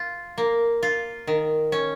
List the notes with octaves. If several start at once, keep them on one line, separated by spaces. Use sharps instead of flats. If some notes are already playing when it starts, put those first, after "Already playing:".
Already playing: F4
A#3
F4
D#3
C#4